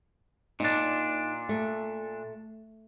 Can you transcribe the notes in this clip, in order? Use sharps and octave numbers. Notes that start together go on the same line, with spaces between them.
A#2 D4 D#4
A3